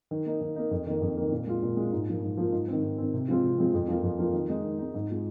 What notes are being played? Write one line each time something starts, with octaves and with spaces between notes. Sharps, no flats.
D#3
A#3 D#4
D#3
A#3 D#4
F2
D#3 A#3
F2
D#3 A#3
A#2
G#3 F4
A#2
G#3 F4
G#2
F3 A#3 F4
G#2
F3 A#3 F4
G#2
D#3 C4
G#2
D#3 C4
C3
F3 G#3 C4 F4
C3
F3 G#3 C4 F4
F2
F3 A#3 F4
F2
F3 A#3 F4
D#3
G#3 D#4
D#3
G#3 D#4
G#2
G#3 F4